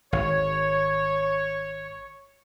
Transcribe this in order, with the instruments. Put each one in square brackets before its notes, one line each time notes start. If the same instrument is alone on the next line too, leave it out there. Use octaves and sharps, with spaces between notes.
[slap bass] G#1 [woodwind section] C#5